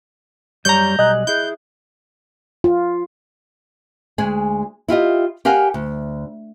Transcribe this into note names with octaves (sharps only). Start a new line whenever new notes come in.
F#2 G3 C#5 A#5 G6
B1 G3 D#5 G#5 F#6
E4 G#4 G6
F4
D2 G#3 G#4 G#5
E4 F4 G4 D#5
G4 A#4 F5 F#5 G#5
D2